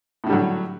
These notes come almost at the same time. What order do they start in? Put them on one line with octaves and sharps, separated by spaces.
A2 D3 G3 F#3